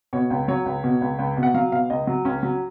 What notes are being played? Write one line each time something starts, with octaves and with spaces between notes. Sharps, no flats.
B2 C#5
C#2
F#3 C#5
C#2
B2
C#2
C#2
B2
F#5
F#3 F5
B2 F5
C#2 D#5
F#3
C#2 C#4
F#3